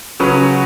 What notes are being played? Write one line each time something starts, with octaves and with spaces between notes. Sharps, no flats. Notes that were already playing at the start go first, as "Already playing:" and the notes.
C#3 F#3 C#4 F#4 B4